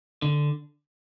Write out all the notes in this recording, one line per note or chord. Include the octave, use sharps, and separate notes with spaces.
D3